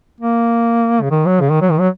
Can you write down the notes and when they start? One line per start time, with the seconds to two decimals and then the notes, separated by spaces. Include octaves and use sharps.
0.20 A#3
1.02 C#3
1.11 D#3
1.26 F#3
1.41 C#3
1.51 D#3
1.62 F#3
1.71 D#3
1.80 F#3